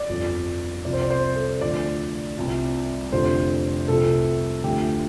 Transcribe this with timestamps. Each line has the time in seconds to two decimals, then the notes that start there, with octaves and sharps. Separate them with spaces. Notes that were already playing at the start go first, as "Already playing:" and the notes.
Already playing: D5
0.09 G1 F2 F3
0.85 C2 C3 F3 D5
0.93 C5
1.01 D5
1.10 C5
1.36 A4
1.61 D2 D3 F3 D5
2.37 C2 C3 F3
3.12 F1 F2 D3 F3 C5
3.88 C2 C3 F3 A4
4.64 D2 D3 F3 G4